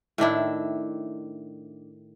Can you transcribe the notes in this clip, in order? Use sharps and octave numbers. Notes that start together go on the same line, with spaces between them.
A2 D#3 D4 E4